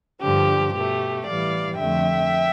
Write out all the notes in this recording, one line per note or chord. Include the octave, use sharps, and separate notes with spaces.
G2 D3 F3 G4
B2 A3 G4
A2 E3 G3 D5 F5
F2 D3 F3 A3 E5 G5